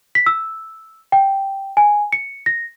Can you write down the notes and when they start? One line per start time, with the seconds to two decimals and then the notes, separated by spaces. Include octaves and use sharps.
0.15 B6
0.26 E6
1.12 G5
1.77 G#5
2.13 C#7
2.46 A#6